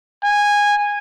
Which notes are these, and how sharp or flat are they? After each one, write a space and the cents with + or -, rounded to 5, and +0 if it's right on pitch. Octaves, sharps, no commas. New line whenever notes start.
G#5 -15